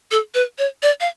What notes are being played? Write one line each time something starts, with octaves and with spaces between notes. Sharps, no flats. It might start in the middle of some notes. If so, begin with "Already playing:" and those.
A4
B4
C#5
D5
F5